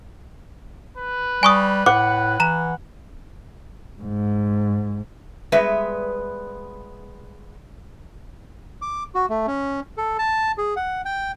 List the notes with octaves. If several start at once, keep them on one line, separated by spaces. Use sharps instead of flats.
B4
G3 G#5 C#6 D#6
A2 F#5 D6
E3 A#5 E7
G#2
G3 G#3 B3 B4 E5
D6
F#4
A3
C#4
A4
A5
G#4
F#5
G5